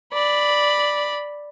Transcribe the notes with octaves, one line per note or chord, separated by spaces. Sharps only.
D5 B5